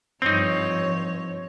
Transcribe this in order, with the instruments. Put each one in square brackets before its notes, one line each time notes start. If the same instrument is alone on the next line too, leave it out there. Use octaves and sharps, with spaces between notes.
[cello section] G2 F3 [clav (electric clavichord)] C4 D#4 [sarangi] C#5